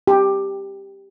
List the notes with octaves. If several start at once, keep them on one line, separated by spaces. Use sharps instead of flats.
G4